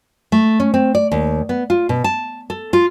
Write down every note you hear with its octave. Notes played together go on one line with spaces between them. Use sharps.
A3
C#4
C4
D5
D#2
B3
F4
B2
A5
A4
F4